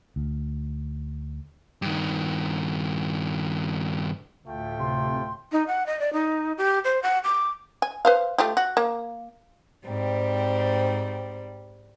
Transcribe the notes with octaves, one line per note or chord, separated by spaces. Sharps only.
D2
G2 D#3
D2 A2 A3 F4 G5
C3 C6
D#4
F#5
D#5
D5
D#4
G4
C5
F#5
D6
G#5
B4 C5 F5
A3 F4 G4
F#4
A#3
G#2 G3 C4